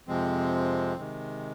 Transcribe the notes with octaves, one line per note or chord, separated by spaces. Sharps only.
F2 C3 F3 G#3 C4
C3 D#3 G#3